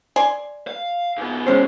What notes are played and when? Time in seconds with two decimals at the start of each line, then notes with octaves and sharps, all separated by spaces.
0.16 D5 G#5 C6
0.68 F5
1.17 G#2 B3
1.47 G#3 C#4 C5